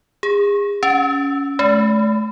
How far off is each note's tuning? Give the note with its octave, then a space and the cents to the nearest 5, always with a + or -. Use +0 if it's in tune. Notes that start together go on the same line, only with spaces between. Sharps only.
G#4 -35
C#4 +15
A3 -35